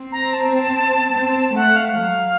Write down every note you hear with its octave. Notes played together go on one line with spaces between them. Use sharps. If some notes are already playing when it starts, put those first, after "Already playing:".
Already playing: C4
A#5
A5
C4
A3 F#5
F5
F#3